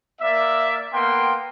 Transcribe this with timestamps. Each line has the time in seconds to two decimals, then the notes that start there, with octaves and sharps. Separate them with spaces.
0.21 A#3 D5 E5
0.93 A#3 B3 G5 C6